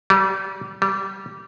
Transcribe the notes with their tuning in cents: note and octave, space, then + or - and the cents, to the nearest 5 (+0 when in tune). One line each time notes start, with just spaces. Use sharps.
G3 -30
G3 -20